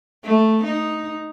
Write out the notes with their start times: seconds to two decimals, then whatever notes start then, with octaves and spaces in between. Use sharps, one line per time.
0.24 A3
0.64 D#4